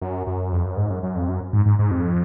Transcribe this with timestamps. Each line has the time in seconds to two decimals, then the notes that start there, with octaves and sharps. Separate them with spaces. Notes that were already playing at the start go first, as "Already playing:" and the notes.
0.02 F#2
0.27 F#2
0.52 F2
0.65 F#2
0.77 G#2
0.90 F#2
1.03 F#2
1.16 F2
1.29 F#2
1.53 G#2
1.66 G#2
1.79 G#2
1.91 F2